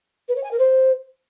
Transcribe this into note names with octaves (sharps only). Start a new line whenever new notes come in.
B4
C#5
G#5
A#4
C5